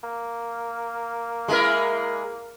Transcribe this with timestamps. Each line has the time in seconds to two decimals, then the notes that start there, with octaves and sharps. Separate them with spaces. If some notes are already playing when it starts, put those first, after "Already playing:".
0.03 A#3
1.48 G#3 E4 A#4